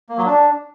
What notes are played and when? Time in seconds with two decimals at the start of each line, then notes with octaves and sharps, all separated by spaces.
0.09 A#3
0.18 F#3
0.26 D4